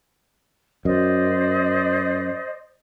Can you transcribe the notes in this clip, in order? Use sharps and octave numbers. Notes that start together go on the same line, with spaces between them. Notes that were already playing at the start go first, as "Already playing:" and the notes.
F#2 C5 D5 D#5